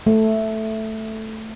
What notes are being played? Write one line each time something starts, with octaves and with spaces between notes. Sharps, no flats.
A3